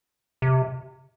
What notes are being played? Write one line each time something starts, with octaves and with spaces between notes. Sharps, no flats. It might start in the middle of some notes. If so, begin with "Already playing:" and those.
C3